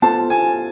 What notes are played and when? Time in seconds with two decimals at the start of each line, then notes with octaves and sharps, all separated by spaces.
0.02 B3 F4 A4 C5 A5
0.30 G#5